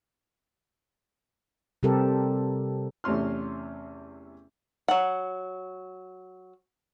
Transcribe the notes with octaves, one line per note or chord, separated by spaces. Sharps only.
C3 G3 C4 G4 A4 A#4
E2 C3 A3 C#4 C6 F6
F#3 F#5